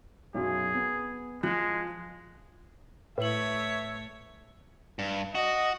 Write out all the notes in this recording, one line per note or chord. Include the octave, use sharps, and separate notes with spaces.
B1 F#2 G#4
B3
F3 G#3 F#6
A2 A3 B4 C#5 E5 F#7
G2
F#4 D#5